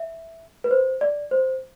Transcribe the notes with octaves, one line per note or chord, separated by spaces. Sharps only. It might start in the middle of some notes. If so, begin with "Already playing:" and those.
Already playing: E5
B4
C5
D5
C5